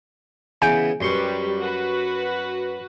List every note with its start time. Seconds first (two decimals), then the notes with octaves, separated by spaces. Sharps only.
0.62 C#3 E3 B3 G#5 G6 D7
1.01 F#2 G3 G4 B4 C6 C#6
1.59 F#4 B4